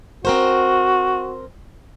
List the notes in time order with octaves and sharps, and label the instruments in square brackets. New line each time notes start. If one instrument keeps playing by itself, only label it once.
[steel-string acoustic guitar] C4 A#4 C5 [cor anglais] F#4